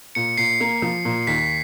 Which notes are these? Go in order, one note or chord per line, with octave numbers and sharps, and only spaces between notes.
A#2 C#7
A#2 C7
A#3
F3
A#2
D#2 B6